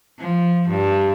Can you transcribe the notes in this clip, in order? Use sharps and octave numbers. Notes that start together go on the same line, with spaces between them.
F3
G2